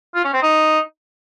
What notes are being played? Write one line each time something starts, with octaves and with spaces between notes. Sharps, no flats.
F4
C#4
C4
D#4